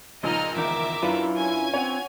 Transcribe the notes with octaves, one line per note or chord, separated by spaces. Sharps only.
C#2 A#2 F3 D#4 D#5 F6
E2 D#3 D#4 A#4 E5 D6
F#2 D4 E4 F4 B4
C#4 G#5 G#6
C4 C#5 F#5